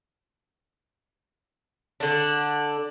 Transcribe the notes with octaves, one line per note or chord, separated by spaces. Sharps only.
D3 D4